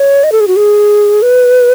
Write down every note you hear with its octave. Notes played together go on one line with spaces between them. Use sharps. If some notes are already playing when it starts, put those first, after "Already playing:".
Already playing: C#5
D#5
A4
G#4
F#4
G#4
B4